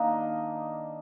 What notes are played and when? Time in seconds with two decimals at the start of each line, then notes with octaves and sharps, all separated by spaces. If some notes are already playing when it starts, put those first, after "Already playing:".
Already playing: D#3 A#3 D4 D#5